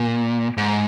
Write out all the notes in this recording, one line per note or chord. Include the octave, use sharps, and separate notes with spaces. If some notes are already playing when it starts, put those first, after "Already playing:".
Already playing: A#2
G#2